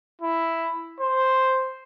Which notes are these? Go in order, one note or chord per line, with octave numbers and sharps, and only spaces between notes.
E4
C5